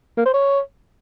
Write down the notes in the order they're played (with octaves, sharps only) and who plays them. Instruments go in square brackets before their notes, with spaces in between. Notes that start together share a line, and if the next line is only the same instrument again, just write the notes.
[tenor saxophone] A#3
C5
C#5